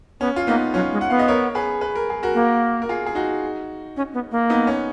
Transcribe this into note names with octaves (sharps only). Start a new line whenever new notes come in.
B3 C#4
F4
A#3 B3 D#4
F#3 C#4 F4
G#3
F#5
B3 F5
D#5
A#4 C#5
G#4 B4
B4
A#4
G#4
F#4 A#4
A#3
A#4
F4 G#4
G#4
D#4 F#4
C#4
B3
A#3
B3 D#4
C#4